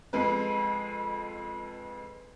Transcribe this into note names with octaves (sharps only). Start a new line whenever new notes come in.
F2 G#3 B4